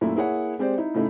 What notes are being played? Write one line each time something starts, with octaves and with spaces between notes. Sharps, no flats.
F#2 A#2 A3 E4
A#3 E4 G#4 C#5 F#5
G#3 C4 G4 C5 D5
D#4 E4
A2 C#3 A3 D#4 E4